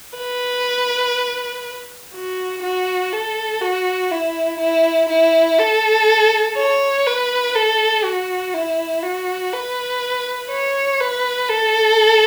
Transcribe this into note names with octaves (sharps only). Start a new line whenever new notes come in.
B4
F#4
F#4
A4
F#4
E4
E4
E4
A4
C#5
B4
A4
F#4
E4
F#4
B4
C#5
B4
A4